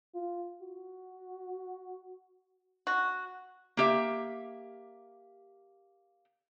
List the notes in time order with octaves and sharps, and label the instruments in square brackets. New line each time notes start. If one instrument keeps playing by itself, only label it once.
[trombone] F4
F#4
[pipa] F#4
[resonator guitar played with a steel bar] A#3 G4 E5